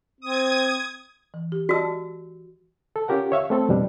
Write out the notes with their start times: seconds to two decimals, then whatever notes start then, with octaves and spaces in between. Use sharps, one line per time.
0.21 C4 D#6 G#6
1.34 E3
1.52 G4
1.69 F#4 D5 D#5 A5 E6
2.96 A4
3.08 C#4 F4 G4 A#4 F#5
3.32 C#5 E5 F5 C#6
3.50 A3 C4 A4
3.69 F2 B2 G3 D4